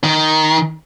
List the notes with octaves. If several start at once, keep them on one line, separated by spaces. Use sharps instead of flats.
D#3